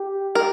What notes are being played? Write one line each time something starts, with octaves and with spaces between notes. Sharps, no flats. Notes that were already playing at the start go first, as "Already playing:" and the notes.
Already playing: G4
G4 A#4